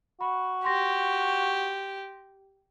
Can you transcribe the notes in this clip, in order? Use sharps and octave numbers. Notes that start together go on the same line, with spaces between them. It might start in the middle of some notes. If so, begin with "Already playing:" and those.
F#4 B5
G4 C6 A#6